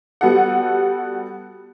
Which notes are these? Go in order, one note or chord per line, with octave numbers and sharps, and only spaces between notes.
G3 B3 F#4 A4 F#5